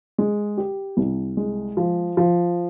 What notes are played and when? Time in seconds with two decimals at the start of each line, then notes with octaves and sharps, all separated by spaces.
0.18 G#3
0.58 G4
0.97 C2
1.37 G#3
1.77 F3
2.17 F3